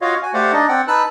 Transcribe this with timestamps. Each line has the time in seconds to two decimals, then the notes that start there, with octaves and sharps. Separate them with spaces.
0.01 F4 F#4 C#5 D#5 F5
0.23 F#4 G#5
0.34 A3 G4 C5 D5 F5 F#5
0.52 D4 D#4 D5 D#5
0.69 C4 D5 F#5 G5
0.88 D#4 B4 A5 E6 F#6